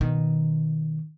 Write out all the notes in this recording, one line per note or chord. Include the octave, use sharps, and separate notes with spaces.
B2 D#3